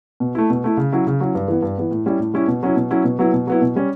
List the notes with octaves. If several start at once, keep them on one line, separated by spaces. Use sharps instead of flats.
B2
A3 E4
B2
A3 E4
C#3
F#3 C#4 E4
C#3
F#3 C#4 E4
G2
E3 B3
G2
E3 B3
A2
G3 C#4 E4
A2
G3 C#4 E4
B2
F#3 C#4 E4
B2
F#3 C#4 E4
B2
F#3 B3 E4
B2
F#3 B3 E4
B2
G3 C#4